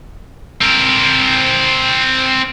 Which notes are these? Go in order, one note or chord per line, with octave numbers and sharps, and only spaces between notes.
C4 A#4